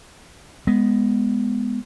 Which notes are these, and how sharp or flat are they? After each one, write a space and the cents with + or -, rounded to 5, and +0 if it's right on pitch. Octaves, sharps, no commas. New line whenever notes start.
G#3 +0 B3 +0